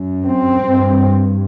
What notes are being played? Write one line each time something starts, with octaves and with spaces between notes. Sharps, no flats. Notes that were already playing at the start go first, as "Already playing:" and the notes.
Already playing: F#2
C4
G2